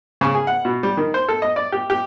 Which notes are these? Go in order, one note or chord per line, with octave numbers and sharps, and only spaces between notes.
C#3
G#4
F#5
B2
G3
D#3
C5
A4
D#5
D5
G4
G4